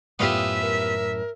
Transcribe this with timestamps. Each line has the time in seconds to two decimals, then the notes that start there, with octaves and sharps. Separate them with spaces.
0.19 F#2 A2 B3 F4 G4 E5 D#6
0.62 A#4